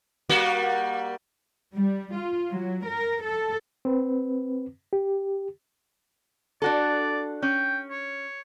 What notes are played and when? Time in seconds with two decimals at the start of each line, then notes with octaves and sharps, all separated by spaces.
0.29 G3 A#3 F#4
1.74 G3
2.14 F4
2.51 F#3
2.86 A#4
3.24 A4
3.85 C4 B4
4.93 G4
6.62 D4 F#4 A4 D5
7.42 C#4 G5
7.91 C#5